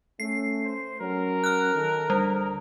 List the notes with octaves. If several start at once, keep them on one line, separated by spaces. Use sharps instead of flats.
A3 C#4 C7
C5
F#3 C#4 A#4
F6 F#6
D#3 A4
D2 D3 G3